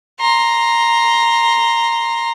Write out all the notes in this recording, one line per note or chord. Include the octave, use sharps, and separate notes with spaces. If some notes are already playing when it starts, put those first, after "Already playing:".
A#5 C6